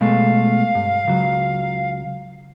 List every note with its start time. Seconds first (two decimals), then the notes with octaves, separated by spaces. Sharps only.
0.01 B2 G#3 A3 F5
0.75 G2
1.07 C#2 F#3